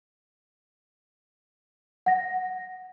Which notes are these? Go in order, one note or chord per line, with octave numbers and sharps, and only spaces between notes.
F#5 A#6